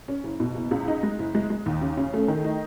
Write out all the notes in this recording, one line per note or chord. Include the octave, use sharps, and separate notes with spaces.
C#4
F#1
B2
F#1
C#2
D#4
G#3
F#1
G#3
G#3
D#2
C#3
C#3
A3
D#3
D#4